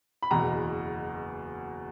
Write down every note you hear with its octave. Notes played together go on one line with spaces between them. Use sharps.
B5
F#1 E2 B2 A#5